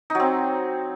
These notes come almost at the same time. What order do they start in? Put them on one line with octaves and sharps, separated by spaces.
D#4 F#3 C4